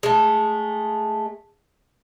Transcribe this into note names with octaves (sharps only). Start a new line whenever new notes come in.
G#3 A3